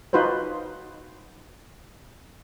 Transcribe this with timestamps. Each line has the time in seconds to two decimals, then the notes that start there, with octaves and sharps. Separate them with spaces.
0.13 D#4 F4 F#4 B4 C5